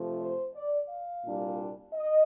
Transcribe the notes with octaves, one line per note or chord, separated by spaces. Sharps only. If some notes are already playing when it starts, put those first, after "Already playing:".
Already playing: C3 F3 A3
C5
D5
F5
C2 A#2 G3 D4
D#5